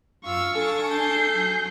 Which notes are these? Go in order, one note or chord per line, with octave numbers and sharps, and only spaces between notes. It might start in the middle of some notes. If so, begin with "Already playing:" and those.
F#2 F4 F5 C#6 E6
D4 G#4 A4 A5
G6 C7
F#3 G#4